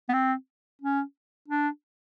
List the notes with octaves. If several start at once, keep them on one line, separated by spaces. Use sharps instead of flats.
B3
C4
C#4
D4